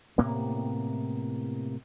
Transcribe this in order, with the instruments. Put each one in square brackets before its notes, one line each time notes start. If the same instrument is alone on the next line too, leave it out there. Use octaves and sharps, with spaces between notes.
[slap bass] A2 C3 A#3 B3